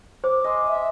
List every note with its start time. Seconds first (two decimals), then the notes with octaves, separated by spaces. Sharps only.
0.24 C5 D6
0.44 D#5 G#5 C6
0.68 E5